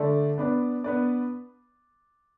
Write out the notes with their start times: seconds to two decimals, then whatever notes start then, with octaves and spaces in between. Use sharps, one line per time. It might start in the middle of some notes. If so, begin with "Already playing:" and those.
Already playing: D3 A3 D4 A4 D5
0.38 B3 D4 B4 D5
0.84 B3 D4 B4 D5